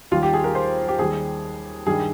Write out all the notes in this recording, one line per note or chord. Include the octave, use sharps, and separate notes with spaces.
D#2 D#3 G3 F4
G4
G#4
A#4
C5
G4
D#2 D#3 G3 G#4
G2 D#3 G3 G#4